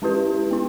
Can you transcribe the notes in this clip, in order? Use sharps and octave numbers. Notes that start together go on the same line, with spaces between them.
G#3 C#4 E4 G4 B4
B3 E4